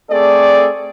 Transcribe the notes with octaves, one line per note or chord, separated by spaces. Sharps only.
A3 C4 G#4 A4 D5